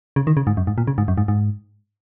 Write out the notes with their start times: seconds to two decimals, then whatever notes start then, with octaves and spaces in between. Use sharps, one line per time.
0.16 C#3
0.27 D#3
0.37 C#3
0.47 G#2
0.57 F#2
0.67 G#2
0.78 A#2
0.87 C#3
0.98 G#2
1.08 F#2
1.18 G#2
1.28 G#2